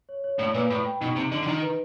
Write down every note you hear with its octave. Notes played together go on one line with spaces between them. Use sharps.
C#5
C#5
A2 D5
A#2 B4
A2 B5
G5
B2 D#4
C3 D#4
D3 D#5
D3
D#3 D#4
B4